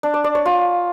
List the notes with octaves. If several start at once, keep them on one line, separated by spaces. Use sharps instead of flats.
D4
D5
D5
C#5
F4